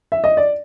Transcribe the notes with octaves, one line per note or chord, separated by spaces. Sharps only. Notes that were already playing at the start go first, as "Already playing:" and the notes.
E5
D#5
D5